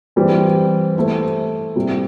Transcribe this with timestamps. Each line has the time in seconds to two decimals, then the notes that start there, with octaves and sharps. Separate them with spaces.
0.16 E3 G3 C4
0.96 A3 E4 C5
1.76 C3 G3 E4